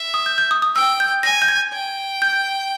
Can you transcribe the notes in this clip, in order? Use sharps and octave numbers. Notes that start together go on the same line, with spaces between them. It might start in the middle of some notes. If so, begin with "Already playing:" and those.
Already playing: E5
D#6
G6
G6
D#6
D#6
G5 E6
G6
G#5 A#6
G6
G#6
G5
G6